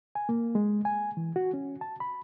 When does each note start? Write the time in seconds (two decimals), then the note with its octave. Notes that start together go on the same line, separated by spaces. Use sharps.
0.15 G#5
0.29 A#3
0.55 G#3
0.85 G#5
1.17 E3
1.36 F#4
1.54 C#4
1.81 A5
2.00 B5